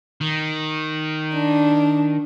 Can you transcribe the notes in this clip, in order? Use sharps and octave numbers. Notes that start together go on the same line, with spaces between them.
D#3
D4